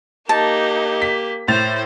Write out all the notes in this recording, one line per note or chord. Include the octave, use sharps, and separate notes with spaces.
A#3 D#4 G4 A5
B6
A2 C5 A6 F7